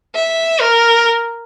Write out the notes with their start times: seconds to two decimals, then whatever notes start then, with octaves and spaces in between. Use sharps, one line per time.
0.15 E5
0.60 A#4